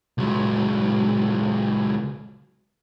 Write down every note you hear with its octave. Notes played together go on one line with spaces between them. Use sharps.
C#2 F#3